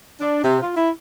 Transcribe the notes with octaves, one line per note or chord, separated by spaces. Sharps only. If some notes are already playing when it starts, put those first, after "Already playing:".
D4
C3
F4
E4